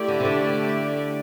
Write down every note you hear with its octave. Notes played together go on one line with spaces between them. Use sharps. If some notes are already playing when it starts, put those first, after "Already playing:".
Already playing: A3 E4 G4 D5
D3
C3
D3